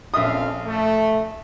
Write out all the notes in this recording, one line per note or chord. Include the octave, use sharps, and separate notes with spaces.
A#1 F2 C#4 E5 F5 D#6
A3